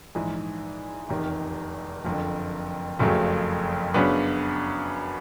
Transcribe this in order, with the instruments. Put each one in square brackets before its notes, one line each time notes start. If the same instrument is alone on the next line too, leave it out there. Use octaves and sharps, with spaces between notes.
[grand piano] A#1 G#2 E3
F1 E2 C3 D#3
F#1 F2 D3
F#1 F2 C#3 F#3 A3
F#2 C#3 F#3 B3 D4